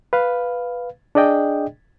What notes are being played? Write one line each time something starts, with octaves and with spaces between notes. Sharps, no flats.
B4 F5
D4 G#4 D5 D#5 G5